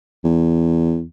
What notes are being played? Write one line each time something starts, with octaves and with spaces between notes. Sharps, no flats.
E2